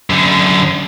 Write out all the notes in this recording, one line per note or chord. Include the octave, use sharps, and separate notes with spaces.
F#2 D3